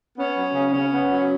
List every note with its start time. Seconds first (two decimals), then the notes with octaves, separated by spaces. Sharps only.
0.18 B3 C#4
0.37 F#3
0.55 C#3
0.73 C#3 C#4
0.93 B3
1.11 F#3